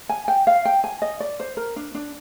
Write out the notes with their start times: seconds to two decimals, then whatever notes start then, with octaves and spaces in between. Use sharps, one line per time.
0.09 G#5
0.28 G5
0.47 F5
0.65 G5
0.84 G#5
1.02 D#5
1.20 D5
1.40 C5
1.57 A#4
1.76 D4
1.95 D4